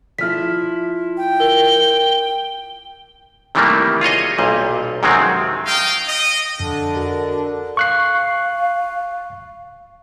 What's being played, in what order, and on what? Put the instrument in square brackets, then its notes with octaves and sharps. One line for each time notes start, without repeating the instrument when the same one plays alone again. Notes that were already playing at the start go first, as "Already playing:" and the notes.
[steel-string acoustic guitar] F3 E4 [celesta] F6 B6
[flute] G5
[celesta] A#4 [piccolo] G7
[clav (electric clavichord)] C3 D#3 E3 G3 A3 A#3
F4 G#4 C#5 D#5
B1 A#2 G3
F#2 C3 D#3 F#3 G#3 C4
[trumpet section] D#5 F5 G5
D#5
[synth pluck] F2 [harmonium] D3 D4
[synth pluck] F#4 A#4 D#5
[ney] F5 [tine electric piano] C#6 F#6 C7